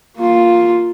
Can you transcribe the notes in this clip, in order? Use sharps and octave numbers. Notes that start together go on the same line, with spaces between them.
A#3 F4